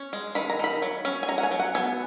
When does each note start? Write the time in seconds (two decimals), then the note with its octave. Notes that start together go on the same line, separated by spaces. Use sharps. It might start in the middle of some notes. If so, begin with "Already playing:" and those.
Already playing: C#4
0.13 G#3
0.35 D#3 B5
0.50 A#5
0.59 D#3 B5
0.82 F#3
1.05 C#4
1.23 G#5
1.28 C#4 A#5
1.38 F#5
1.43 G#5
1.51 F#3
1.60 F#5
1.75 B3 G#5